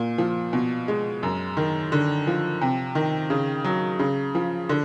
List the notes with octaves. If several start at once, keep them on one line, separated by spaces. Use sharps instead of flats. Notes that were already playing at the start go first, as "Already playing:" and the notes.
Already playing: A#2
F3
B2
G#3
F#2
D#3
D3
F3
C3
D#3
C#3
F#3
C#3
F3
D3